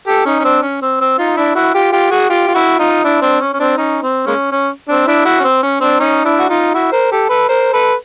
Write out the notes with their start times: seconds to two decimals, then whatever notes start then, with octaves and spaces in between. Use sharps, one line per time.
0.07 G4 A4
0.25 C#4 D#4
0.40 C#4
0.44 C4 D4
0.62 C#4
0.82 C4
1.00 C4
1.18 D#4 F4
1.37 D4 E4
1.55 E4 F#4
1.74 F4 G4
1.92 F4 G4
2.11 F#4 G#4
2.29 F4 G4
2.48 F4
2.54 E4 F#4
2.79 D#4 F4
3.04 D4 E4
3.21 C4 D4
3.41 C#4
3.53 C#4
3.59 C4 D4
3.77 C#4 D#4
4.02 C4
4.27 G#3 A#3 C#4
4.52 C#4
4.88 C4 D4
5.07 D4 E4
5.25 E4 F#4
5.40 C#4
5.44 C4
5.63 C#4
5.81 C4 D4
5.99 C#4 D#4
6.25 D4 E4
6.39 F#4
6.49 D#4 F4
6.74 E4 F#4
6.92 A#4 C5
7.11 G4 A4
7.29 A4 B4
7.48 A#4 C5
7.73 A4 B4